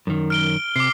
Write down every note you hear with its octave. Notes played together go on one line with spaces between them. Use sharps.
F#2 D#3
F6 D7 G7
C3 D6 C7